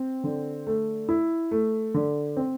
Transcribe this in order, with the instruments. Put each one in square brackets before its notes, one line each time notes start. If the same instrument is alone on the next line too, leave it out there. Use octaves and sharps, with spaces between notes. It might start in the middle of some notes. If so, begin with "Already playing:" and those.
Already playing: [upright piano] C4
D3
A3
E4
A3
D3
C4